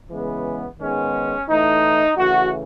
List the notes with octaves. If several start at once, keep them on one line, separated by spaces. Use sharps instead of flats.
C#3 E3 G#3 B3
G#2 D#3 G#3 B3 C#4
A2 E3 A3 D#4
C#3 E3 A3 F#4